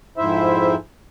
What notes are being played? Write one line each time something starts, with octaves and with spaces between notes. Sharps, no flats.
F2 G#2 E4 C5 E5